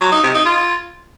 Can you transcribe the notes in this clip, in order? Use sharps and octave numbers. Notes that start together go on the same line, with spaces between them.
F#3
D#4
C3
D#4
F4